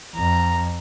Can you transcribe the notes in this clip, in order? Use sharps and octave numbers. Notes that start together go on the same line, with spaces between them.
F2 A#5